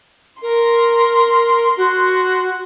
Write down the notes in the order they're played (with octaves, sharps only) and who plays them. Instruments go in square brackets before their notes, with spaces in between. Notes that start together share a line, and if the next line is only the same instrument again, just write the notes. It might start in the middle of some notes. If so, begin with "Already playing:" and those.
[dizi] A#4 [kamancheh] C6
[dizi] F#4